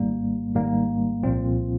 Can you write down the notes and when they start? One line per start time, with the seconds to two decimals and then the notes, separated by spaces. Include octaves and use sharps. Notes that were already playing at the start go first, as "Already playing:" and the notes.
Already playing: G#1 G#2 G3 A#3
0.54 G#1 G#2 G3 A#3
1.23 C2 A#2 F3 C4 F4